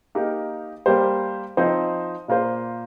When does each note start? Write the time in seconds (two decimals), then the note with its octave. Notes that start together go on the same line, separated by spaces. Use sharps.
0.15 A#3 D#4 G4 A#4
0.86 G3 A#3 G4 C5
1.57 F3 C4 D#4 C5
2.28 A#2 A#3 F4 C5